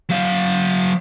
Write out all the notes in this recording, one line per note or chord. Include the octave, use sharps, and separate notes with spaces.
F#3 F5